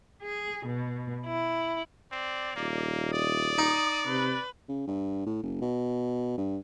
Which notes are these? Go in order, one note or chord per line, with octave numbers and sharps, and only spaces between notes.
G#4
B2
E4
C4 D5
D#1 A#3
D5 D#6
D#4
C3 B4
C#3
G2
A2
F#1
B2
G2